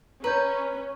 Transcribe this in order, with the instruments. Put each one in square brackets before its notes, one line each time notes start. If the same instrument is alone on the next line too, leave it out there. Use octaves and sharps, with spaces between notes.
[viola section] C#4 [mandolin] B4 [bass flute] C#5 [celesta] A#5 G6